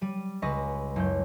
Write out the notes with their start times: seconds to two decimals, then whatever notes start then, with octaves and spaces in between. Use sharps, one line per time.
0.01 G3 D#7
0.42 C#2 B4 D#5 C#6 A#6
0.96 F#1 G6